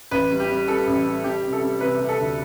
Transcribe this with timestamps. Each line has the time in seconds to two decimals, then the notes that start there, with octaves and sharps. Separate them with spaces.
0.11 A1 B4
0.31 G3
0.40 G4
0.50 G3
0.68 G3 A4
0.87 A1
1.06 G3
1.24 G3 G4
1.43 C3
1.53 A4
1.63 G3
1.80 C3 B4
1.99 C3
2.09 A4
2.18 D2